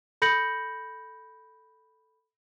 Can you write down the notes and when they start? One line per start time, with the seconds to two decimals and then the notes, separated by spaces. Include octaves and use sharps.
0.22 A4 B5 G6 A#6 C#7 F#7